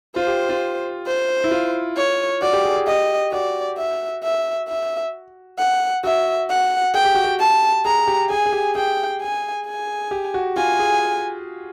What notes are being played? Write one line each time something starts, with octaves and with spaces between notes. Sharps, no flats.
F4 C5
G4
F4
C5
E4
F4
C#5
F#4 D5
G4
G#4
G#4
G4 D#5
F#4 D5
E5
E5
E5
F#5
F#4 E5
F#5
G#4 G5
G4
F#4
G4
A5
G#4 A#5
G4
G#4 G#5
G#4
G4
G#4 G5
G#5
G#5
G4
F#4
F4 G#5
G#4